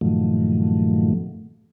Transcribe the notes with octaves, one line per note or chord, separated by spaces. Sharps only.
G2 A#2 D#3 F3 F#3 A3